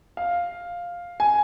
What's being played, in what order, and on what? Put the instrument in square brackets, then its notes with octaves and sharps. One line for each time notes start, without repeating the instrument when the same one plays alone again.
[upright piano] F5
G#5